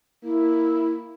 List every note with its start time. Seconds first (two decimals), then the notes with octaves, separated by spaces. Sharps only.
0.24 A#3 E4